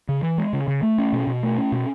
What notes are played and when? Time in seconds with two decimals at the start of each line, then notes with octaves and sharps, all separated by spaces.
0.09 C#3
0.23 E3
0.38 G#3
0.53 C#3
0.68 C#3
0.83 A3
0.98 C#4
1.13 B2
1.27 B2
1.43 A3
1.58 C#4
1.72 B2